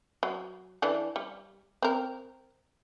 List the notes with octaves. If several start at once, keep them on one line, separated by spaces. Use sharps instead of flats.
F#3
E3 D4 A4
G3
C4 A#4